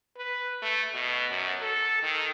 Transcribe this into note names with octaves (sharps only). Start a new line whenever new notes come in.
B4
A3
B2
F#2
A4
D#3